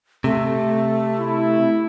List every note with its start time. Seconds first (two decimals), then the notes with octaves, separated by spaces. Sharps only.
0.24 C3 A3
1.20 E4